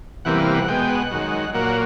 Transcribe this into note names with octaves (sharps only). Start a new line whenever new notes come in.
E2 C3 E3 G3 A#3 F#5
F5
F#5
B2 G#3 G5
F#5
F#2 D#3 G#3
A#2 F#3 A#3 F#5